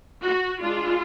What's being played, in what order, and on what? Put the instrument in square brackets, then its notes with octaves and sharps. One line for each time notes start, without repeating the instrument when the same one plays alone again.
[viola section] F#4
G#3 D4 F4